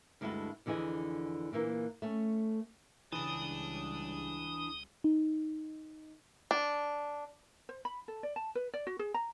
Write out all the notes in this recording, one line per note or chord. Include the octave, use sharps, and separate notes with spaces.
D2 G2 G#3 E4 F#4 A4
F2 D3 E3 G#4 D#5
A#2 D3 E3 A#3
A3 C#4
C#2 C#3 E3 G3 D4 A5 D#6
D#4
D4
C5
B5
A4
D5
A5
B4
D5
F#4
G#4
A#5